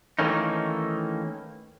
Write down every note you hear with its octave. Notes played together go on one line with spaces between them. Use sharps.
D#3 E3 A3 A#3 C#4 D#4